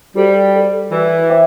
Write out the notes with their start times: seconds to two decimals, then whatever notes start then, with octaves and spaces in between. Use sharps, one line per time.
0.15 G3 F#4 A4 C5
0.54 F#4 A4 D5
0.91 E3 F#4 B4 D5
1.30 C5 E5 G5 D6